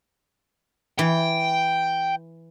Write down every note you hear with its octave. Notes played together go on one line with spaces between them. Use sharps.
E3 G5